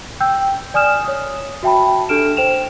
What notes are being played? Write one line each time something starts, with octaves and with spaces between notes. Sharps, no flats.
G5 E6 G6
D5 G#5 D#6 F6 E7
C#5 D#6
F#4 E5 G5 A5 B5
D4 G4 A4 F6 D7 E7
C5 G5 E7 F7